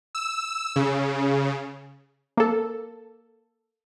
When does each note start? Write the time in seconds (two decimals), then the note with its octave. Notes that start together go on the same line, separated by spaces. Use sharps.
0.15 E6
0.76 C#3
2.37 A#3 A4